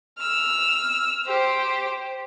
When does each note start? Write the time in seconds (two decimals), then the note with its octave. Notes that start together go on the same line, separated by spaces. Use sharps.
0.18 E6 F6
1.25 G4 C5